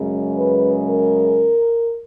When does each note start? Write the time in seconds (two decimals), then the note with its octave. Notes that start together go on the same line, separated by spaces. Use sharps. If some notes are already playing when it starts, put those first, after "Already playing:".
Already playing: F#2 C#3 G#3
0.36 B4
0.88 A#4